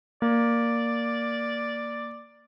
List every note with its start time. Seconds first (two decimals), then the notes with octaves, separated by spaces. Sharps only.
0.22 A#3 D5